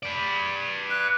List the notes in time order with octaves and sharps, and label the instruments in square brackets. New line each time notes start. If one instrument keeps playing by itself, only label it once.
[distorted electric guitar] B4 D5
[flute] F#6